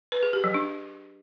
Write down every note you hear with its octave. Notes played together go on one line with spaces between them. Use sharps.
B4
G#4
G4
F#3
D4